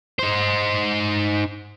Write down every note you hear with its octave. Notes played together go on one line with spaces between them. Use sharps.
D#4 C5